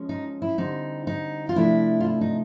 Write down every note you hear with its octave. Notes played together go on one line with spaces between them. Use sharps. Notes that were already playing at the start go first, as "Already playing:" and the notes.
Already playing: F3 G#3 C#4
D#4
E4
D3 G3 C4 D#4
D#4
F4
C3 F3 A3 D4 E4
F4
E4
D#4